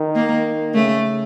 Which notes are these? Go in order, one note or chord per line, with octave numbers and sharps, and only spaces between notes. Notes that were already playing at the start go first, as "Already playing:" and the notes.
Already playing: D#3
A#3
C#3 A3